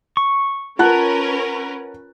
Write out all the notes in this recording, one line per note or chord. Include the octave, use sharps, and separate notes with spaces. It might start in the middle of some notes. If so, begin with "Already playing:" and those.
C#6
C#4 F4 A#4 B4 F#5 A5 F#6